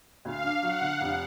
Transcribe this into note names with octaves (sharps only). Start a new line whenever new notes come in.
D2 F5
D4
F#3 F#5
D3
F1